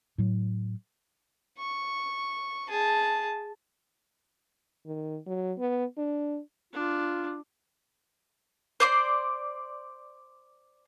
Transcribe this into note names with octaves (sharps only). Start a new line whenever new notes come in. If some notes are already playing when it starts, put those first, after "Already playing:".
A2 F#3
C#6
G#4 A5
D#3
F#3
B3
D4
D4 F4
C5 D5 C6